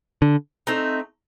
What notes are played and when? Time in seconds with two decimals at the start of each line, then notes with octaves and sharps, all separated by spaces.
0.22 D3
0.67 A3 C4 D#4